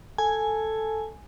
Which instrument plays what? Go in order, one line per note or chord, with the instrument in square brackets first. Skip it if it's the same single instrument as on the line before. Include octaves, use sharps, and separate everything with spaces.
[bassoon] A4 [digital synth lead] G#5